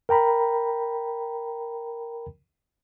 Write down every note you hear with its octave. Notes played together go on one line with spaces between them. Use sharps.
A#4 G5 A#5 B5